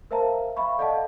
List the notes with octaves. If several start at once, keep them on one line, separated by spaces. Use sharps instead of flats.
A#4 C5 E5 F5 A5 A#5
E5 F5 B5 C#6
A4 D5 D#5 F5 F#5 A5